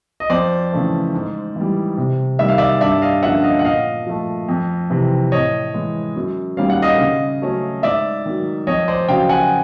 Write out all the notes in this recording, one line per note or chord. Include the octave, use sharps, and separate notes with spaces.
D#5
F2 C5 D5
C#3 E3 A3 C4
G#2
E3 G3
C3
D#3 G3 E5
F5
D5 E5
G2 D5 E5
D#5 F5
D3 F3 A#3 C#4 E5 F#5
D#5 F5
F#5
A#2 D#5 F5
F3 A3
F2
C3 E3
A2 C#5 D#5
E3 G#3
F#2
D#3 G3 A#3 C#4 F5
F#5
D#5 F5
C#3
F#3 A3 C#4
G#2 D5 E5
D#3 F#3
F2 C#5 D#5
C5 D5
C#3 F#3 F5 G5
F#5 G#5